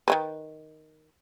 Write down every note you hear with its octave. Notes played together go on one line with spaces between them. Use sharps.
D#3 A#3 B4